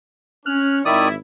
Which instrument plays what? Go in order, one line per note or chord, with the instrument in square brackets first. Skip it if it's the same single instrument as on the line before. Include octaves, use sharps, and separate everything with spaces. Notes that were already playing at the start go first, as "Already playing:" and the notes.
[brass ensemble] C#4 [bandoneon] F6 F#6
[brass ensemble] G#1 E4 [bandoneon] D#3 D5 D#6